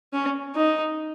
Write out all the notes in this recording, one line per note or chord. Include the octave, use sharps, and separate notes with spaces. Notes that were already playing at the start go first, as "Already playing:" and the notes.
C#4
D#4